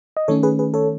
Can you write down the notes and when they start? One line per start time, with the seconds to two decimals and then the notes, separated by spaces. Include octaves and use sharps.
0.17 D#5
0.28 D#3 A3 C#4 A4 C#5
0.43 G#4 B4
0.59 G#4 B4
0.74 A4 C#5